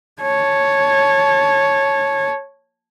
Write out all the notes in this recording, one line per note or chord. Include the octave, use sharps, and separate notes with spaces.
C#5 A5